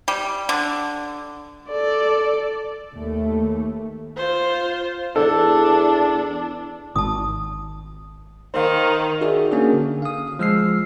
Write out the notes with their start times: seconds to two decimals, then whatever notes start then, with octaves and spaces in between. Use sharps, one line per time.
0.08 G3
0.49 D3
1.69 A4 D5
2.93 D#2 A3
4.17 F4 C5
5.16 E2 D4 A4
6.96 G#1 A5 D#6
8.54 D#3 C5 F5
9.21 D#4 F#4 G#4 A#4 D5 E5
9.52 A#3 C#4 D4 F#4 G#4
9.73 D3
10.02 F5 D#6
10.39 F3 G#3 E6 F6 C7